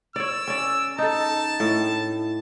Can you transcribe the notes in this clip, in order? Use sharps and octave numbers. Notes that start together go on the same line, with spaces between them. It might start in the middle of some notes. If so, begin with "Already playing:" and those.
C#5 D5 E6
C#4 D5
D#4 A4 A5
A2